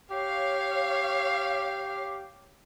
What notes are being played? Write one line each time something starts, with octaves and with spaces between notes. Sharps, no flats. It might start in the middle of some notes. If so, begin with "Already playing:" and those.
G4 C#5 F5